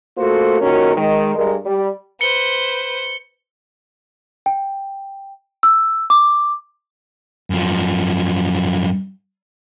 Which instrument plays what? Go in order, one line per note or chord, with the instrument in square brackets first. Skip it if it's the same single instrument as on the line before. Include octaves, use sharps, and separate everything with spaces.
[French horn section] A3 A#3 F4 F#4 A4 C5
A#2 D#3 C#4 D#4 F#4 A#4
D#3 G#3
G2 G#3 A#4
G3
[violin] B4 C5 [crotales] C#7 G7
[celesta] G5
E6
D6
[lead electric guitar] F#2 F3